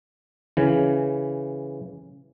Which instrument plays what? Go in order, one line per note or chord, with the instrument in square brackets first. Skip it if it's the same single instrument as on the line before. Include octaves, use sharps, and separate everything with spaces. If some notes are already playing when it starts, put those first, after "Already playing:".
[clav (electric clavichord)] C#3 E3